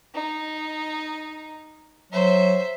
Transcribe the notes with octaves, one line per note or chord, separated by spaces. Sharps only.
D#4
F#3 C5 E5